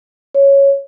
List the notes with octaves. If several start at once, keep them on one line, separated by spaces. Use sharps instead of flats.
C#5